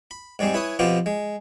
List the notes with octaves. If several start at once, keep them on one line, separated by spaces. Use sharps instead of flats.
B5
G#2 G3 G#3 C4
E4 B4 C#5 G#5 D#6
B2 F3 B3 C4 F4 G4
G#3